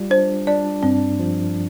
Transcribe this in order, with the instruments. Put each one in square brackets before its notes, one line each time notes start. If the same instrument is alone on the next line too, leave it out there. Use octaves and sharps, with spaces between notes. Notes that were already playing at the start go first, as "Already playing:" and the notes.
Already playing: [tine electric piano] G3 F4
[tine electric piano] D4 [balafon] C5
[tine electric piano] D4 [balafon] D5
[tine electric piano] G2 [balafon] C4
[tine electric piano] F3